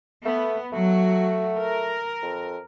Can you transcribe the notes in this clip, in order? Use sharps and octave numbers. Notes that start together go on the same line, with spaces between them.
A3 B3
F#3 A3 F#4
A#4
F2